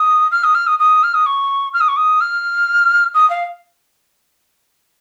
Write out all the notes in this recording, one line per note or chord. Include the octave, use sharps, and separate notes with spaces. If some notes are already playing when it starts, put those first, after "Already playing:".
Already playing: D#6
F6
D#6
F6
D#6
D#6
F6
D#6
C#6
F6
D#6
C#6
D#6
F6
D#6
F5